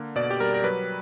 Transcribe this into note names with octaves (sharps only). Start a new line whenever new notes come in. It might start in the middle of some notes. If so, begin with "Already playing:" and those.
Already playing: D3 A#3
B2 D5
G4
G3 A#4
A#4
F#3 B4